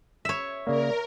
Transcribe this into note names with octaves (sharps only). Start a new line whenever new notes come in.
C#5 E5
C#3 A#3 A#4 D5